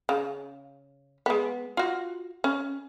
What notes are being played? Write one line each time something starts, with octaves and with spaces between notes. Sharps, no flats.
C#3
G#3 B3
F4 F#4
C#4